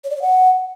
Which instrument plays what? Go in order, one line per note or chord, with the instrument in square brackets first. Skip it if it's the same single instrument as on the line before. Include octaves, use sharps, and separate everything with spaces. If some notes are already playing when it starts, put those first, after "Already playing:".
[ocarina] C#5
D5
C#5
F#5